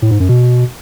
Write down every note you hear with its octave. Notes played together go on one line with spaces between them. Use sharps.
A2
G#2
F#2
B2